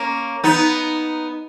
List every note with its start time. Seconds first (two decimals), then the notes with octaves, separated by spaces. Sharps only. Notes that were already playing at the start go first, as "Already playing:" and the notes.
Already playing: A#3 C#4
0.44 B3 D#4